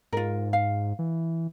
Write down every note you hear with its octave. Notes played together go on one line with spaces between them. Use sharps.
G#2 F4 A#4
F5
E3